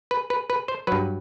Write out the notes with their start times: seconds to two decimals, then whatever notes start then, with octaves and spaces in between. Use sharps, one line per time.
0.11 B4
0.30 B4
0.50 B4
0.68 C5
0.87 G2 F#3 B4